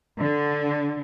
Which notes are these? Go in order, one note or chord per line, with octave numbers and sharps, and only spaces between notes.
D3